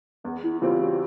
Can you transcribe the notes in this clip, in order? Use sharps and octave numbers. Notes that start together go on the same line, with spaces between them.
E2 B3
E4
C#3 E3 G3 C4 F4
F#4